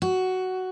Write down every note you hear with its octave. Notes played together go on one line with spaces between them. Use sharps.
F#4